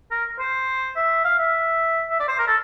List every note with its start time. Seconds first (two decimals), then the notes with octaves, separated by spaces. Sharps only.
0.11 A#4
0.40 C5
0.96 E5
1.25 F5
1.39 E5
2.10 E5
2.20 D5
2.29 C5
2.39 A#4
2.47 A4